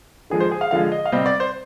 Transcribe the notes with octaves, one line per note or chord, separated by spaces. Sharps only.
D3 F3 G#3 G#4
C5
G#4
F5
D3 F3 G#3 F5
D#5
F5
C3 G3 C4 D#5
D5
C5